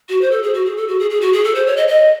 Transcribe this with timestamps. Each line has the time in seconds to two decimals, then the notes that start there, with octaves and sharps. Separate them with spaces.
0.09 F#4
0.21 C5
0.31 A4
0.43 G#4
0.54 F#4
0.65 G#4
0.77 A4
0.88 F#4
1.00 G#4
1.10 G#4
1.21 F#4
1.33 G#4
1.44 A4
1.55 C5
1.67 C#5
1.77 D#5
1.88 D#5